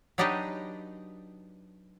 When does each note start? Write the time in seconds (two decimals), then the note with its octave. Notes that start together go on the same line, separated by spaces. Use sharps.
0.18 F#3 D4 D#4 G4 B4 D#5